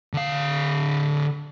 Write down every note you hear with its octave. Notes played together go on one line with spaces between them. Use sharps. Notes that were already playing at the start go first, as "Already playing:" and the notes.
D3 F5